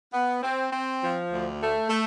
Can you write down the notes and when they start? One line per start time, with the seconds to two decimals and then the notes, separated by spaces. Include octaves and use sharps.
0.13 B3
0.42 C4
0.72 C4
1.02 F3
1.32 D2
1.61 A3
1.89 A3